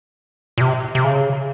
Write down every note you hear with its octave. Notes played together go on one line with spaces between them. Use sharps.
A#2
C3
C3
C#3